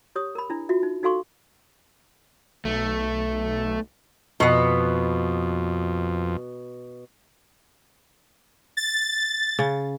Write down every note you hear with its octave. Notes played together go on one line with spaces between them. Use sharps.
G4 C#5 D#6
A#4 B5
D4 E4
F4 F#4 E5
D#4
D#4 F#4 A4 F5 C6 C#6
B1 A3
F2 B2 B3
A6
C#3